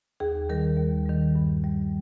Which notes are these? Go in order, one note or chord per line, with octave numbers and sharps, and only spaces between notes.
D#2 G#4
D#3 G3 A#4
D#2
D#3 G3
G2
G3